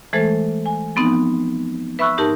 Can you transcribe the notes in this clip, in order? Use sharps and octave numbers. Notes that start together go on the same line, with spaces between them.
E3 G#3 A3 A4 C5
G#5
F3 B3 C4 D#4
B4 E5 B5 C#6 E6 F#6
G#2 D#4 G4 A#4 A5